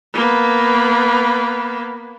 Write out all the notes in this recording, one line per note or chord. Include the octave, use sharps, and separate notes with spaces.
A#3 B3